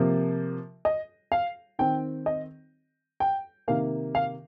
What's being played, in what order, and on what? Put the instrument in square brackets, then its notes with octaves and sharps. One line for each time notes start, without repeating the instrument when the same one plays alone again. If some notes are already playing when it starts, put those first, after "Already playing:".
Already playing: [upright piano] C3 F3 A#3
D#5
F5
D#3 C4 G5
D#5
G5
C3 D#3 A#3 F5
F5